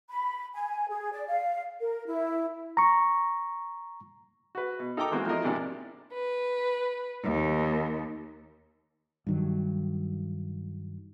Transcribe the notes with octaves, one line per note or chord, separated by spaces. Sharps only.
B5
G#5
G#4
D5
F5
A#4
E4
A#5 C#6
F#4 B4
B2
D#4 A4 A#4 G5 A#5 D6
E3 G#3 A#3 C4 F#4
F3 A3 A#3 E4 A#4 D#5
G#2 C3 D4 E4 D5
B4
D#2
G2 D#3 F#3